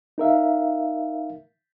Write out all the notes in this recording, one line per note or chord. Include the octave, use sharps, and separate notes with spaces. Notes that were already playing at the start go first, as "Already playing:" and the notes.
D#4 A#4 E5 F5